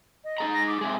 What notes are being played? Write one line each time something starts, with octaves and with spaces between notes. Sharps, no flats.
D#5
D#4 G#4 A#5
A#6
D6
C3 G#3